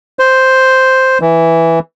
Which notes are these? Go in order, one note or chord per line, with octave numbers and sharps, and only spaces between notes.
C5
E3